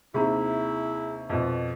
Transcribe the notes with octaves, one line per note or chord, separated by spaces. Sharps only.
D#2 C3 E4 G#4 A#5 B5
F2 B2